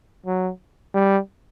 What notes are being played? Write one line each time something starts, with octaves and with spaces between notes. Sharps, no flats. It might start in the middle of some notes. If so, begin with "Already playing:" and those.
F#3
G3